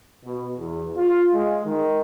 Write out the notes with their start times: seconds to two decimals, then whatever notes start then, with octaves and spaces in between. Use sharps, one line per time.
0.25 B2
0.57 E2
0.96 F4
1.33 G#3
1.65 D#3